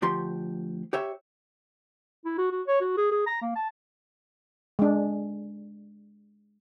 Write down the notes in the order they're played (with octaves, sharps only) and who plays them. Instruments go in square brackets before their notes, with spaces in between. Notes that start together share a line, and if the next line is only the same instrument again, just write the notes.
[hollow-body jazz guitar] D2 F3 G4 C6
G4 C#5 E5
[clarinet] E4
F#4
F#4
C#5
F#4
G#4
G#4
A#5
A#3
A5
[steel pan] G#3 D4